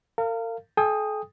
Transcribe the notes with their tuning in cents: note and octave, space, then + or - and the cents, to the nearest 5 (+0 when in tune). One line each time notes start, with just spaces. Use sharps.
A#4 -40 F5 -15
A4 -45 G5 +35 D#6 +0